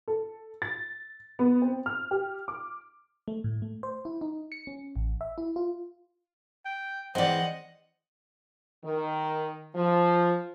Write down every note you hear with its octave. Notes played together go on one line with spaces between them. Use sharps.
A4
A6
B3
C4
F6
G4
D6
A3
A2
A3
C5
E4
D#4
C#7
C#4
A1
E5
E4
F4
G5
E3 G#3 C4 C5 D5 D#5 F#5
D#3
F3